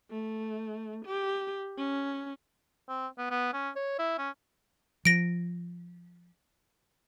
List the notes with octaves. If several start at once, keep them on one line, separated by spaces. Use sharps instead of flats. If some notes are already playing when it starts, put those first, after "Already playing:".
A3
G4
C#4
C4
B3
B3
C#4
C#5
E4
C#4
F3 A#6 D7